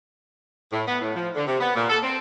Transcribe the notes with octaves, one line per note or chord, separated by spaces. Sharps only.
A2
B3
A2
F3
D3
C3
B3
A#2
A4
C4